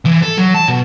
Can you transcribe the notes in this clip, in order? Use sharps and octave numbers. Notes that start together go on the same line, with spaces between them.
E3
A4
F#3
A5
B2